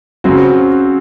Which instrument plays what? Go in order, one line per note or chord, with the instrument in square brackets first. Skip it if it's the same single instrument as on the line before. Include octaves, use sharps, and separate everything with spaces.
[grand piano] C#3 F#3 C4 F#4